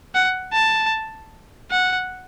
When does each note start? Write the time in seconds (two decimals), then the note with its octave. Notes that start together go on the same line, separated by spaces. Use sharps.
0.15 F#5
0.53 A5
1.71 F#5